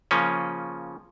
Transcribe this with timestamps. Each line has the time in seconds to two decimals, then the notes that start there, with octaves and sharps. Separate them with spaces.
0.11 C#3 F3 A#3 C#4